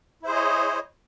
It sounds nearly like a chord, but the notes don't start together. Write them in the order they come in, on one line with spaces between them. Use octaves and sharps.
E4 C5 G#4 D#5 C#5